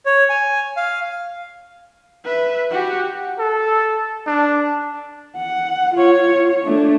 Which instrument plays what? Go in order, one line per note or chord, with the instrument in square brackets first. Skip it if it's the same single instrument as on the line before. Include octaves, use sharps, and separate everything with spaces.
[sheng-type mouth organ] C#5
G#5
F5
[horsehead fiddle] B4 E5
F#4 G4
[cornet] A4
D4
[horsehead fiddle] F#5
F4 C#5
A3 D4